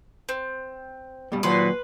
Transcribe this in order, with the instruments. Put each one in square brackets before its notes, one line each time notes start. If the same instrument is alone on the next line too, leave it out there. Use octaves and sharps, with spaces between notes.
[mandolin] C4
[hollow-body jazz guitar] G2 B2 G3
[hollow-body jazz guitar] D#2 F#3 C5 [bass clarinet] A#2 [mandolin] B4 C6